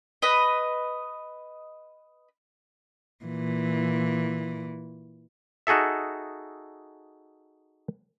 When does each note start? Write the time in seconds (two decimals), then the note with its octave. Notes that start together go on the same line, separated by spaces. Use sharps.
0.22 B4 D#5
3.25 A#2 E3
5.67 D#4 F#4 G#4 A4 E5